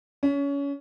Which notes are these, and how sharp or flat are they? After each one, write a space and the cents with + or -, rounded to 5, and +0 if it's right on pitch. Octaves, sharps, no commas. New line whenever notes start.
C#4 +25